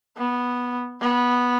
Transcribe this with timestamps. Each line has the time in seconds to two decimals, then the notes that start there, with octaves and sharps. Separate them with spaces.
0.18 B3
1.01 B3